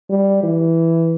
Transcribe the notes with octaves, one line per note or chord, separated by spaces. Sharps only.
G3
E3